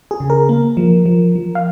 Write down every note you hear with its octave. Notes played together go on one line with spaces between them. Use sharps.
G#4
C#3
A#4
A#3
F3
F3
F3
F5